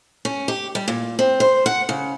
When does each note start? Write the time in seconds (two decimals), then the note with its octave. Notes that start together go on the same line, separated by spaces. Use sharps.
0.25 C#4
0.48 G4
0.75 G3
0.88 A#2
1.19 C4
1.40 C5
1.66 F#5
1.89 C#3